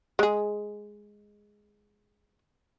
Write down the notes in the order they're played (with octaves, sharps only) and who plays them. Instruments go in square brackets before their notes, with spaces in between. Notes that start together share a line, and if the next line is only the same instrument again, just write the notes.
[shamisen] G#3 G#4